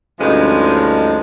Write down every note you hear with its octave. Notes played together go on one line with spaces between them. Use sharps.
D2 G2 F3 G#3 C#4 D#4